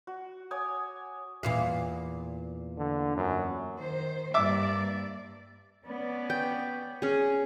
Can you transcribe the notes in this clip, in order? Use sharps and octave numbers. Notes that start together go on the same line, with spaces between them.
F#4
C#5 G#5 D6 D#6
E2 A#2 F5
D3
F#2
D#3 C5
G2 A#3 D5 E5 D6
B3 C#4 D5
G5
C#4 G#4